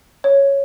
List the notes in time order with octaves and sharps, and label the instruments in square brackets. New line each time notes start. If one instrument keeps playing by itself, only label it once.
[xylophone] C#5